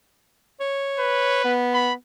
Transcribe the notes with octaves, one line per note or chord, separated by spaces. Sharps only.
C#5
B4
B3
B5